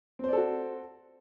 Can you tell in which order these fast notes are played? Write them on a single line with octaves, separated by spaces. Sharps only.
C4 C5 D5 A4 F#4